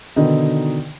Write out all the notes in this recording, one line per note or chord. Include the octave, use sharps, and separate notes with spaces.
B2 D3 D#3 D#4